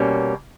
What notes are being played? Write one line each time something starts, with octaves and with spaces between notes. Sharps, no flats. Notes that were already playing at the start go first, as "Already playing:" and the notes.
Already playing: B2 G3 A#3 C#4